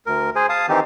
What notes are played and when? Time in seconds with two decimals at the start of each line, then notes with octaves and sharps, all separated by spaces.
0.06 D2 A#4
0.36 G#4 C5 G#5
0.49 F5 A5 D#6
0.69 D#3 E3 C4 D#4 G4